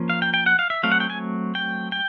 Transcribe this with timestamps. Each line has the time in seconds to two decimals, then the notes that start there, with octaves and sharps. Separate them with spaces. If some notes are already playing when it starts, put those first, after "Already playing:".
Already playing: F3 A#3 C#4
0.10 F5
0.22 G5
0.34 G5
0.46 F#5
0.59 F5
0.70 E5
0.83 F#3 A3 C4 F5
0.92 F#5
1.00 G5
1.10 G#5
1.55 G5
1.92 G5